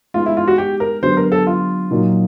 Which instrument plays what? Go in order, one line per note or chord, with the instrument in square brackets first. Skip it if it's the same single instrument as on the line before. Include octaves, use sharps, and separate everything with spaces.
[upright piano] G#3 B3 D#4 [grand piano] F4
[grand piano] E4
F4
F#4
G4
A#4
[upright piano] D3 F#3 B3 D4 G4 [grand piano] C5
[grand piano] A#4
A4
F4
[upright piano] A#2 F#3 A#3 D#4